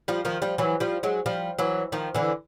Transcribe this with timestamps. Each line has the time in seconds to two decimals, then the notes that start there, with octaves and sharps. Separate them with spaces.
0.08 F3 G3
0.25 D#3 F3
0.42 F3 G3
0.58 E3 F#3
0.80 F3 G3
1.03 F#3 G#3
1.26 F3 G3
1.59 E3 F#3
1.92 D#3 F3
2.15 D3 E3